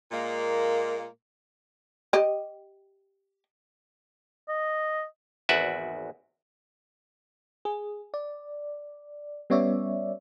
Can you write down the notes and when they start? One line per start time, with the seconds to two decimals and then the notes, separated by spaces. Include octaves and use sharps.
0.12 A#2 G#3 A#3
2.13 G4 D#5
4.48 D#5
5.49 G#1 E2 F#4 B4 D5 E5
7.65 G#4
8.14 D5
9.50 G3 B3 C#4 C#5 D5 E5